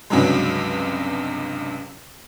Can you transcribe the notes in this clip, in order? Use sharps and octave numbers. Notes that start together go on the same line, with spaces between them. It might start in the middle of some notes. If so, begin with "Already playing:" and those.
C#2 G2 C3 F#3 G#3